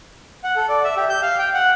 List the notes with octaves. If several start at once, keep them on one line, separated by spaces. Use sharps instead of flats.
F#5
A4
D5
E5
G4
G6
F5
G5
F#5